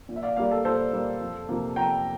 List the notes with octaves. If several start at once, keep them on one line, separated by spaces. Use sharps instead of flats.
A#2
E5
D5 F5
G3 A#3 D5 F5
A4
A#2 A4 C5
G3 A#3
F2
C3 F3 A#3
F2 G5 A#5